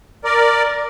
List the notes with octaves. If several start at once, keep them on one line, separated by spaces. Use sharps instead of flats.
A#4 D5